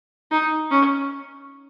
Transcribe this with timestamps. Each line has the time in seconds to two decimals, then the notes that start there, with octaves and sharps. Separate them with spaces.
0.31 D#4
0.71 C#4